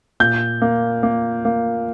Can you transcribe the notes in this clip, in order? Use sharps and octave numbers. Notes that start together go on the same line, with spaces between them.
A#2 G6
A#3
A#3
A#3